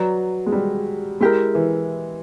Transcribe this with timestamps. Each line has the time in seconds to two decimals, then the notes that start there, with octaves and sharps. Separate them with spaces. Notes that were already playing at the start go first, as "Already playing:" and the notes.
Already playing: F#3 B4 D5 A#5
0.46 G#3
0.52 G3
1.20 G#3 E4 G4 A#4
1.55 E3